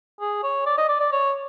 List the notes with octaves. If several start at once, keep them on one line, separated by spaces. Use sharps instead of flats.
G#4
C#5
D5
D#5
D5
D5
C#5